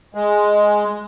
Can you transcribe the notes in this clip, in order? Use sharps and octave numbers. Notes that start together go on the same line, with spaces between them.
G#3